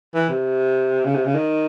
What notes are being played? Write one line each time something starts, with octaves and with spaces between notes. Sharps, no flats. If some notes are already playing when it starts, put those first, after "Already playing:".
E3
C3
C#3
C3
C#3
D#3